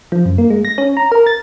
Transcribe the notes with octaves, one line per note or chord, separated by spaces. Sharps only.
F3
F#2
A#3
G#3
A#6
C#4
A#5
A#4
A6